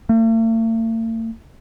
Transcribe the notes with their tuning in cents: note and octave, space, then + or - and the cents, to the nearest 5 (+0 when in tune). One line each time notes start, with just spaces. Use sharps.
A3 +45